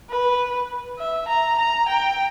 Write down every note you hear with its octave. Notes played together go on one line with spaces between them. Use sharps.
B4
E5
A#5
A#5
G5